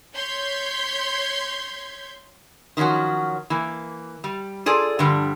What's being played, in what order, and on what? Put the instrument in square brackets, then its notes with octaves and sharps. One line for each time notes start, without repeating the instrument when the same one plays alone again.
[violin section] C#5 C6 G6 G#6 B6
[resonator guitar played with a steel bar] D#3 F3 F#3 C#4 F#4
E3 A#3
G3
F4 G#4 A4 D5
G2 D3 F3 G3